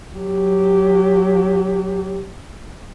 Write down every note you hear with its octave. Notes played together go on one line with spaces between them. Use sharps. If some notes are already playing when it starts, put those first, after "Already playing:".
F#3 G4